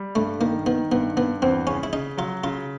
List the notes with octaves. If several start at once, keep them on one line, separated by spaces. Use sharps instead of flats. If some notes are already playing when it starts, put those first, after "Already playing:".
Already playing: G3
G2 A3
D#3 A#3
D#3 B3
G2 B3
G2 B3
E2 C4
C#3 C#4
E4
C#3 D#4
F#3 F4
C#3 F4